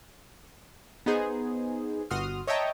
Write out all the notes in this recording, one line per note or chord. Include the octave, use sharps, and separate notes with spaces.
B3 D#4 G#4 C5
G1 F#4 C6 D#6 F6
C#5 D#5 E5 G5 A5 A#5